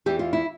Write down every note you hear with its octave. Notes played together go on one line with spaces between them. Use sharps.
E2 E3 G4
F4
E4